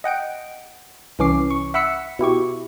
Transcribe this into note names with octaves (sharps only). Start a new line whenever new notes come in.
D#5 F#5 G5 D7
C2 E3 C#4 D6 C7
C#6
E5 F#5 B5 E6 B6 C#7
B2 E4 G4 C#6